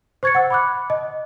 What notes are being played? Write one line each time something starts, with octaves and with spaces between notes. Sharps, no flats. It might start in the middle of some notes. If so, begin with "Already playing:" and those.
C5 C#6 G#6 A6 C#7
F#5 E6
B5 D6 F#6
D#5